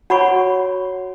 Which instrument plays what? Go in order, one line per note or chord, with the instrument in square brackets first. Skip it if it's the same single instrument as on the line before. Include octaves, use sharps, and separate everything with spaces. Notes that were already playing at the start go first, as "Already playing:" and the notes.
[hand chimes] F#4 C#5 [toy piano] F#5 B5 C#6